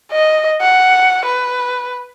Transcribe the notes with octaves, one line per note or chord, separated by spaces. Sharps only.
D#5
F#5
B4